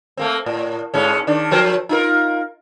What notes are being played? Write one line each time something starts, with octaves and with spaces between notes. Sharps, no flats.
A3 A#3 C4
A2
G#2 G#3 C#4
D#3 D4
F3 A#4 C5
D#4 F4 A#4